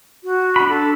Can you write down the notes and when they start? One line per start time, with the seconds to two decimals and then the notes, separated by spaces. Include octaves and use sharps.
0.24 F#4
0.56 D4 B5
0.68 A4